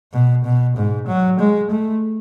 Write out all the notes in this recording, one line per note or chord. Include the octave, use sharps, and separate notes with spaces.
B2
B2
G#2
F#3
G#3
A3